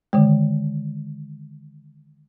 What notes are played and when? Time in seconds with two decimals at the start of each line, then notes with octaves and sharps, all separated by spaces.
0.13 D3 D#3 G#3